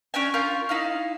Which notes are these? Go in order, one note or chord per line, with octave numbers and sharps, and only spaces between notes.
C#4 D4 G5 G#5
C#4 F4 A#4 G6
D#4 E4 F5